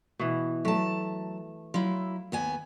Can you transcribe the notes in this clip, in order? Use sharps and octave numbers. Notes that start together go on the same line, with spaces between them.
B2 E3
F#3 A3 A5
F#3 E4 F4
D#2 B3 G#5